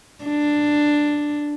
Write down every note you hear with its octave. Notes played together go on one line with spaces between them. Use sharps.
D4